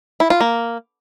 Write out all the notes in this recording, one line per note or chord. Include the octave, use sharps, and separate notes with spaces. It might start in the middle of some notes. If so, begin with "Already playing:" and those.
E4
F4
A#3